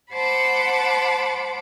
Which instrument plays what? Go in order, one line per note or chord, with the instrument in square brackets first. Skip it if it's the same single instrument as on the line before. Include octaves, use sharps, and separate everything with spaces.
[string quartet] C5 F#5 A5 B5 D6